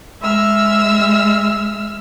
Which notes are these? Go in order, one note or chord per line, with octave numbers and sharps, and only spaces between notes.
G#3 E5 E6 F6